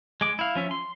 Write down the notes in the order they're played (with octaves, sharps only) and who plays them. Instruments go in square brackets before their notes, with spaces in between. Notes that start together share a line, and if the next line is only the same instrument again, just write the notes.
[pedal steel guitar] G#3 D6
E4 F5
F3 C#4 E5
C6